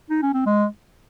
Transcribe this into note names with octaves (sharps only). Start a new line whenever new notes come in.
D#4
C#4
C4
G#3